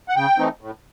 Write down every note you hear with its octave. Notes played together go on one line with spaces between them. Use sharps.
F#5
C#3 G5
E3 A3 C4 D#4
A2